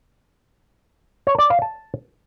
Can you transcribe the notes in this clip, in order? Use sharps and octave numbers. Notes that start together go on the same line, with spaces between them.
C#5
D5
F5
A5